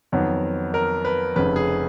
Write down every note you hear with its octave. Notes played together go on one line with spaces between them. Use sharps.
F2 D#3 F#3 B3
A#4
B4
F1 F2 C#3 B4
G#4